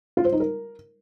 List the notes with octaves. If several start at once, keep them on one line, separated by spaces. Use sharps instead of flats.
F4
C5
D#4
A#4